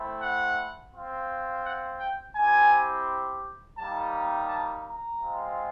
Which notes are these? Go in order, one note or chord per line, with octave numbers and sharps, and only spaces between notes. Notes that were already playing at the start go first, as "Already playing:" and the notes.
Already playing: A3 C4 E4
F#5
C4 F4
F#5
G5
C4 E4 G4 G#5
G3 A#3 D#4 G4 A5
A5
A#5
G#3 C4 F4